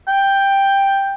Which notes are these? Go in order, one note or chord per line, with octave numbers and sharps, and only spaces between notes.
G5